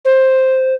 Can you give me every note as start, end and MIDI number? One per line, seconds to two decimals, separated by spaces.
0.05 0.75 72